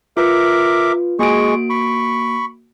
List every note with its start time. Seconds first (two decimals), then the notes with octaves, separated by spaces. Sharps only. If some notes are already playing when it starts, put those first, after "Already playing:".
0.17 F4 A#4 B4 E5 D6
1.19 G#3 A#3 F#4 G#4 C#6 D7
1.70 B5 C#6